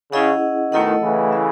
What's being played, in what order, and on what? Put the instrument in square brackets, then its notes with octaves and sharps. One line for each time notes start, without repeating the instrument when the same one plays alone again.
[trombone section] C#3 [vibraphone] C#4 E4 G#4 D#5 F#5
[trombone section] B2 D#3 [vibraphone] A3 E4 A4 D#5 F#5
[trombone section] C#3 E3
[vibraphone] A4 E5